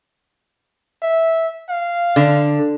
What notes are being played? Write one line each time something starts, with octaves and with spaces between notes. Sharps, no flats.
E5
F5
D3